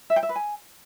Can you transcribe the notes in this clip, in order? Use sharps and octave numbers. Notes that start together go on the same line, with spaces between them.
E5
G5
E5
B4
G#5